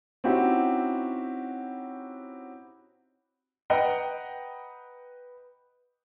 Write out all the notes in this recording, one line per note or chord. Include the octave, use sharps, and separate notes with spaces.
C4 C#4 D#4 E4 F#4 G4
B4 D#5 F#5 G5 A#5